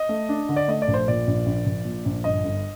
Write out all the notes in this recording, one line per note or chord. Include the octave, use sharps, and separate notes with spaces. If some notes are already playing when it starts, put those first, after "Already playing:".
Already playing: D#5
A3
D4
D3
D5
A3 D#5
D5
A#1
C5
A#2 D5
A#1
A#1
A#1
A#2
A#1
G1 D#5
G1